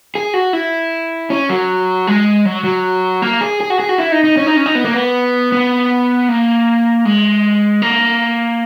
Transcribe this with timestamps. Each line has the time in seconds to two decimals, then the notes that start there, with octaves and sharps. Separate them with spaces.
0.15 G#4
0.34 F#4
0.53 E4
1.30 C#4
1.49 F#3
2.07 G#3
2.45 F#3
2.64 F#3
3.22 A#3
3.41 G#4
3.60 G#4
3.70 F#4
3.80 G#4
3.89 F#4
3.98 E4
4.12 D#4
4.24 D#4
4.37 C#4
4.46 D#4
4.56 C#4
4.66 D#4
4.75 B3
4.85 A#3
4.94 B3
5.52 B3
6.29 A#3
7.05 G#3
7.82 A#3